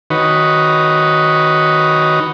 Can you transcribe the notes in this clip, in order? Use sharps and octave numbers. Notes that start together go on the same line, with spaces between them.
D#3 D#4 F#4 B4 C#5